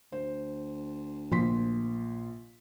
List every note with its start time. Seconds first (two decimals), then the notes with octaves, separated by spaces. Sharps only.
0.12 D2 C5
1.32 A#1 F3 C6 B6